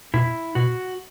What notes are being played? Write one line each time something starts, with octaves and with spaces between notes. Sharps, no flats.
B2 E4
B2 F#4